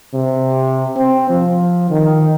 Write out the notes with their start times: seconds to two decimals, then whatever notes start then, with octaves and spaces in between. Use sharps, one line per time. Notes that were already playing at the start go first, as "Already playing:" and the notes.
0.14 C3
0.96 C4
1.29 F3
1.90 D#3